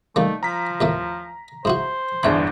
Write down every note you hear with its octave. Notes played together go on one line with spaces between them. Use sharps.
G3 A3 A#3 D#4
F3 A#5 B6
D#2 A2 A3
G#2 E4 F#4 C5
G1 E2 G#2 D4 E5 B5